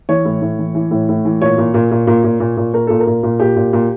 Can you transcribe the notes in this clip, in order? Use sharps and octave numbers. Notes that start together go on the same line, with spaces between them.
E3 C#5
A2
A2
E3
E3
A2
A2
E3
A#2 C#5
A#2
A#2
A#2
A#2
A#2
A#2
A#2
A#2 A#4
A#2 A4
A#4
A#2
A#2
A#2 G4
A#2
A#2